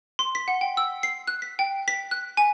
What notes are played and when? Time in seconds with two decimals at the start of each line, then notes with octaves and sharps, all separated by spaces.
0.19 C6
0.35 B6
0.48 F#5
0.61 G5
0.77 E6
1.03 C7
1.27 F#6
1.42 B6
1.59 G5
1.88 B6
2.11 F#6
2.37 G#5